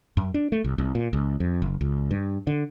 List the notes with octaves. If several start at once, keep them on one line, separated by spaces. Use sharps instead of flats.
F#2
D4
A3
C2
C2
A#2
C#2
F2
F#1
C#2
G2
D3